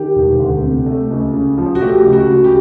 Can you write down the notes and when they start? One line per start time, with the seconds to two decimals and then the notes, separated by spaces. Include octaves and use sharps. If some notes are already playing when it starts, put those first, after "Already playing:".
Already playing: D#3 G4
0.16 E1
0.39 D2
0.63 C3
0.86 A3
1.10 C#2
1.34 C#3
1.58 F3
1.75 F#4
1.81 A3 G4
2.05 C#2
2.13 F#4
2.29 C#3
2.44 G4